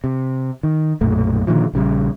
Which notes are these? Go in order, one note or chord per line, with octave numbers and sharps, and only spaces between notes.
C3
D#3
B1 F#2 A#2 A3
A#2 D3 D#3 F3
A#1 C#3 F3 G3